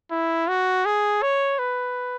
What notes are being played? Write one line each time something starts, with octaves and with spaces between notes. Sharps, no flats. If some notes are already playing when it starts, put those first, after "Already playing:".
E4
F#4
G#4
C#5
B4